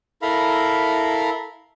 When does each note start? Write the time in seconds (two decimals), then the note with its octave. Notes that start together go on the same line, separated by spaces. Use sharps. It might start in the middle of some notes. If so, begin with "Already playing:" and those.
0.22 E4 A4 A#4 F5 A#5 B5